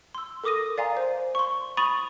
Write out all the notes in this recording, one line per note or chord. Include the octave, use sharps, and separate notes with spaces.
C6 E6
A4 A#4 D6 D#6 A#6 D#7
D5 F5 G#5 A#5 C6
C5
C6 C#6
B5 C#6 D#6 A6 D#7 F7